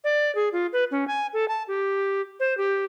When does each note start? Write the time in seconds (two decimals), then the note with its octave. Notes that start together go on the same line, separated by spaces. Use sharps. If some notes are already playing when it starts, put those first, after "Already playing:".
0.04 D5
0.35 G#4
0.53 F4
0.73 B4
0.91 C#4
1.08 G#5
1.33 A4
1.48 A5
1.68 G4
2.40 C5
2.58 G4